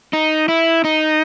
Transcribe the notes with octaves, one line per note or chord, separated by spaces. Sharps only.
D#4
E4
D#4